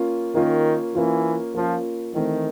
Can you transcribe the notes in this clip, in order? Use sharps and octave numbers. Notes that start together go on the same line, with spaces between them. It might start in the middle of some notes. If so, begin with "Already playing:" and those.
Already playing: A#3 C#4 F4
D#3 A#3 C#4 F4
E3 A#3 C#4 F4
F3 A#3 C#4 F4
D#3 E3 A3 C4